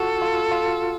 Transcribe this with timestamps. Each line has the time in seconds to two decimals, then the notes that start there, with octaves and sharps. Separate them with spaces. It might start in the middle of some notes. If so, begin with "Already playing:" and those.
Already playing: F4 F#4 A4
0.22 F4
0.51 F4